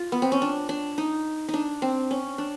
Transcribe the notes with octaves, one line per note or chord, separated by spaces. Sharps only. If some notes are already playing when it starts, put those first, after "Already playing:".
Already playing: F4
B3
C4
C#4
D4
D4
D#4
D#4
D4
C4
C#4
D4